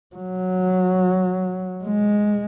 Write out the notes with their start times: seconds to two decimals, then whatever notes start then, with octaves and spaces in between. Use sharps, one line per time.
0.16 F#3
1.84 G#3